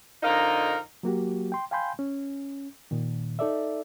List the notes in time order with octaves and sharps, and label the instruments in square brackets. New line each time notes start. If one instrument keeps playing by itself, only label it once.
[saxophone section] F2 D3 D#4 A#4 D#5 F5
[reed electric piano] F#3 A#3 F#4 G4
G5 C6
F5 G5 G#5 B5 C6 G6
C#4
A#2 D#3
D#4 A4 D5 E5